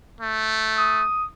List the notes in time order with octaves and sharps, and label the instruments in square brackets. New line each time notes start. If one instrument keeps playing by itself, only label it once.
[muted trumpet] A3
[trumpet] D#6